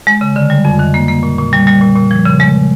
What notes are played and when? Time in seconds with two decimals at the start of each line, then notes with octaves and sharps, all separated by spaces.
0.07 G#3
0.21 C#3
0.36 D3
0.50 G3
0.65 F2
0.79 D#3
0.94 A#3
1.08 A#3
1.23 A#2
1.38 A#2
1.53 G3
1.67 G3
1.81 A#2
1.96 A#2
2.11 F3
2.25 C#3
2.40 G#3